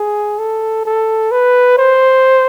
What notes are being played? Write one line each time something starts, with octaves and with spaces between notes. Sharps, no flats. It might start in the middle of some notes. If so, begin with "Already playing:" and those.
Already playing: G#4
A4
A4
B4
C5